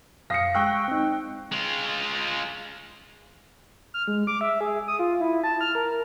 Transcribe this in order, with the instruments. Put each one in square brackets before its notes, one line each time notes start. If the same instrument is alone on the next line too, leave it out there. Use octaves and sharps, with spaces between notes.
[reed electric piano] F#2 F5 D#6 [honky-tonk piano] A#6 C7 C#7
[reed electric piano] G#3 C#6 E6 [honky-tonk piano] G5 F#6
[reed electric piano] C4 D#4
[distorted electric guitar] G#3 F4
[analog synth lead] F6
G#3
D6
E5
G#4
D#6
F4
E4
A5
F6
A#4